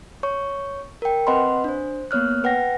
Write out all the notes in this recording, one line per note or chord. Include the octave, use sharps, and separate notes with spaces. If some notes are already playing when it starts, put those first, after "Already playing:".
C#5 C#6
A#4 G5
C4 B4 D#5 F#5 B5 C6
D4 C5
A#3 B3 C#5 F6 F#6
B4 F#5 G5 A#6